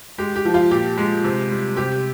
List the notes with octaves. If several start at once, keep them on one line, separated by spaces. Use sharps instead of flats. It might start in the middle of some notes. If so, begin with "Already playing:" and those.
G#3 G4
G4
F3
F4
A#2 G4
G#3
C3
G3
C3 G4